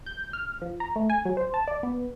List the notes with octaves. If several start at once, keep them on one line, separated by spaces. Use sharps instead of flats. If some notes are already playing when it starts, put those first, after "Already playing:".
G6
F6
F3
A#5
A3
G#5
F#3
C5
A5
D5
B3